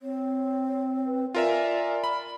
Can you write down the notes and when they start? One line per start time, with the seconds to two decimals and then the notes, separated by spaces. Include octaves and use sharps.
0.02 C4 C#5
1.07 B4
1.35 F4 A#4 D5 E5 G#5
2.04 B5